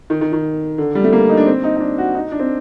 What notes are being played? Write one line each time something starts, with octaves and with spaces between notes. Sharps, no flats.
D#3
D#3
D#3
D3
G3
A3
A#3
D#4
D4
C4
D#4
D#4
D4
F#4
D#4
D4
C4